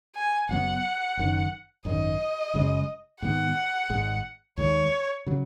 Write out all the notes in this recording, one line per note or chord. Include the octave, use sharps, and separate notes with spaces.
G#5
F#1 F#2 F#3 B3 F#5
F#1 F#2 D#3
G#1 F#2 D#3 D#5
F#1 F#2 C#3 G#3
G#2 D#3 B3 F#5
G#1 G#2 G#3
D#2 D#3 G#3 C#5
C#3 F#3